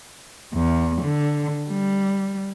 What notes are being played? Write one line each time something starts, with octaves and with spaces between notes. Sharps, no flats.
E2
D3
G3